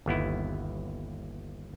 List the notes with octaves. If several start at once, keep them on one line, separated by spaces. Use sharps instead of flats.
G1 D#2 B3 E4